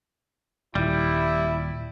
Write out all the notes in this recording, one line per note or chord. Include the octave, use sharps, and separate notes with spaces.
D#1 G3 E4